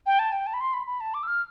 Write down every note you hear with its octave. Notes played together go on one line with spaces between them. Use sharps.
G5
A5
G5
A5
B5
C6
B5
B5
A5
D6
E6
F6